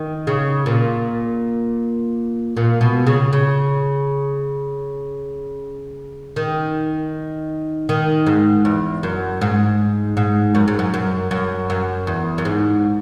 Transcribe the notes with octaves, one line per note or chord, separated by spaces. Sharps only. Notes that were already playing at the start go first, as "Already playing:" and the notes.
Already playing: D#3
C#3
A#2
A#2
B2
C#3
C#3
D#3
D#3
G#2
E2
F#2
G#2
G#2
F#2
G#2
F#2
F#2
F#2
F#2
E2
F#2
G#2